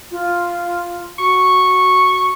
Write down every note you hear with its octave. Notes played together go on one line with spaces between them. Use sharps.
F4
F#4 C#6